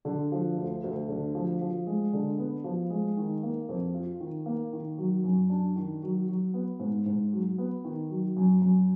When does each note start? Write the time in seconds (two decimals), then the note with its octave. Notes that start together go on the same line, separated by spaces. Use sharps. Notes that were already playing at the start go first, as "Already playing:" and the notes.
0.05 D3
0.32 F3
0.57 D2
0.84 D2
1.09 D3
1.35 F3
1.61 F3
1.87 G#3
2.13 D3
2.38 B3
2.64 F3
2.90 G#3
3.17 D#3
3.43 A#3
3.69 F2
3.94 F4
4.20 D#3
4.46 A#3
4.73 D#3
4.98 F#3
5.24 F#2
5.50 D4
5.76 D#3
6.03 F#3
6.28 F#3
6.54 B3
6.80 G#2
7.06 G#2
7.33 F#3
7.58 B3
7.84 D#3
8.10 F#3
8.36 F#2
8.62 F#2